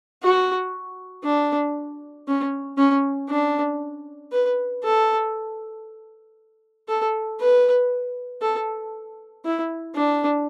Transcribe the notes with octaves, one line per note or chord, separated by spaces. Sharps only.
F#4
D4
C#4
C#4
D4
B4
A4
A4
B4
A4
E4
D4